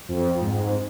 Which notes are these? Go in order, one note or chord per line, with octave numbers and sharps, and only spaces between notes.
F2
G#2